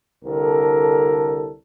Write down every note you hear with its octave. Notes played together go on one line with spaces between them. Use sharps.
C2 D3 A4 A#4